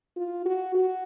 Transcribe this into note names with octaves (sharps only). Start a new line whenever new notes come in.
F4
F#4
F#4